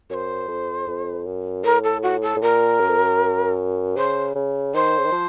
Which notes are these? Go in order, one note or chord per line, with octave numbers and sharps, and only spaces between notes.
F#2 C5 C#5
F2
F2
F#2
A2 A#4
A4
F#4
A4
A2
A#2 A#4
F#2
F2
F#2
C#3 C5
C#3
D#3 C5
C#3
D#3
F3